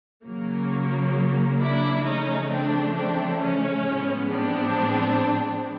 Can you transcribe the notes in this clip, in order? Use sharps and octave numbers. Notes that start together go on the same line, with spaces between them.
C#3 F#3 A#3
D4 E4
C#3 F3 A3 C#4 D#4
C4 D4
C4 D4
C#4
A2 F3 G#3 B3
C4 D4